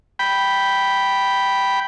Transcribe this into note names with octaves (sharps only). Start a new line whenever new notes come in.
G5 B5